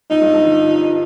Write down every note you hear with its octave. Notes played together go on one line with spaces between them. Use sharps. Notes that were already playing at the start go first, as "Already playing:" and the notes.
F2 D#4
G2
G2
D3 F3